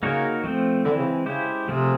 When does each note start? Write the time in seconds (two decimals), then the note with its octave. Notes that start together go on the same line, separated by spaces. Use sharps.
0.03 C#3 A#3 D#4 F#4 A#4 C#5
0.44 F3 A3 C4
0.85 D3 E3 G#3 C4 E4
0.99 C#3
1.26 C#3 G#3 C#4 E4 G4 C5
1.67 C3 F3 A3 C4 F4 G#4